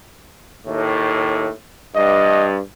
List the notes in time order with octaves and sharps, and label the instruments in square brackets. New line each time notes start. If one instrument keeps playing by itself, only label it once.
[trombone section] D#2 A2
[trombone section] G2 [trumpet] D#5